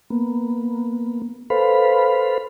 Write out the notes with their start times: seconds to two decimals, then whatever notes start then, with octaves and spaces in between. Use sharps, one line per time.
0.10 A#3 B3
1.50 A4 B4 C5 F5 B5